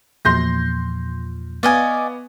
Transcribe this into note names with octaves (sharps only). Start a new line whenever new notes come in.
E2 A#2 F3 C6 G6 A#6
B3 D5 D#5 F5 G#5 C#6 D6